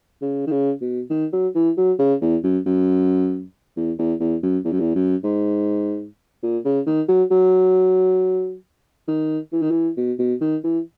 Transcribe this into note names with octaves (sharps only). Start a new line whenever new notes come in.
C#3
D#3
C#3
B2
D#3
F#3
E3
F#3
C#3
E2
F#2
F#2
E2
E2
E2
F#2
E2
F#2
E2
F#2
G#2
A#2
C#3
D#3
F#3
F#3
D#3
E3
D#3
E3
B2
B2
D#3
E3